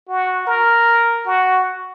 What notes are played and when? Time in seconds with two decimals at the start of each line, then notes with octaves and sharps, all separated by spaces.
0.08 F#4
0.47 A#4
1.26 F#4